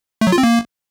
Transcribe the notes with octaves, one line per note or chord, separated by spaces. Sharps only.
A3
F#3
F4
C4
A#3